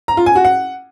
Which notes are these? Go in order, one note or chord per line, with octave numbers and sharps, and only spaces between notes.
A#5
F4
G#5
F#4
F#5